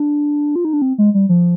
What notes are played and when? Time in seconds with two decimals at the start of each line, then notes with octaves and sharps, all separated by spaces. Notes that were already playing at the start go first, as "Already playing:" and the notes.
Already playing: D4
0.56 F4
0.65 D#4
0.73 D4
0.82 C4
0.98 G#3
1.14 G3
1.29 F3